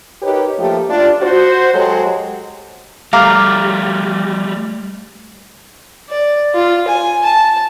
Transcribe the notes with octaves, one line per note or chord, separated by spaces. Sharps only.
D#4 G4 A#4 B4 C#5
F3 A3 A#3 G4
D4 F4
F#4 C5
F#3 G#3 G4 A4 C#5
G3 A3 F5 A#5 D6
D5
F4
G#5
A5